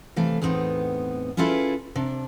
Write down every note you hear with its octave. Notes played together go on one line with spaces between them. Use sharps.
C3 E3 A3 F5
E2 A2 B3 C4 D#4
C#4 E4 F4 G#4 A4 B4
C3 D4